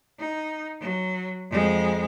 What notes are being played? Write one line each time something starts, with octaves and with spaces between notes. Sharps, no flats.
D#4
F#3
F2 G#3